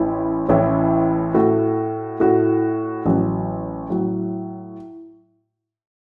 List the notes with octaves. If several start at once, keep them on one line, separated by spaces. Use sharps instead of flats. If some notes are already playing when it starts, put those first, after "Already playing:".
Already playing: A1 A2 E3 C#4 E4
A1 A2 E3 C#4 E4
A2 A3 F#4
A2 A3 F#4
A1 A2 F#3
A2 F#3